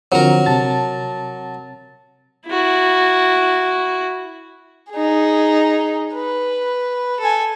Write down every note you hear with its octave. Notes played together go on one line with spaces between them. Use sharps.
D3 F3 F#3 C4 A#4
C3 A5 A6
E4 F#4
D#4 G#4
B4
A4 G#5